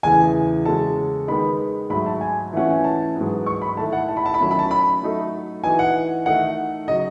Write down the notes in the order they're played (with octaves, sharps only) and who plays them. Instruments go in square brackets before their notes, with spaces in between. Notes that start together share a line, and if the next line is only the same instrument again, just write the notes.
[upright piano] E2 C#3 E3 A3 [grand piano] G#5
[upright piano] C#3 G#3 C#4 F#4 A4 [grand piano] A5
[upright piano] D#3 G#3 B3 D#4 [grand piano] B5
[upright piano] G#2 F#3 A3 [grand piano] B5
[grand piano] A5
G#5
[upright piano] E3 A3 C#4 [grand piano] F#5
[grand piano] G#5
A5
[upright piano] G#2 F#3 B3
[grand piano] C#6
B5
[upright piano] D#3 A3 E4 A4 [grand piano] A5
[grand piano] F#5
A5
B5
A5
B5
[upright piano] D#3 F#3 A3 C#4 [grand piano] A5
[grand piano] B5
A5
B5
[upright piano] F#3 A3 D#4 A4
[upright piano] E3 B3 D#4 F#4 [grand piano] G#5
[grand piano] F#5
[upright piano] D#3 A3 D#4 A4 [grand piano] F#5
[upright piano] C#3 F#3 [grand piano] D#5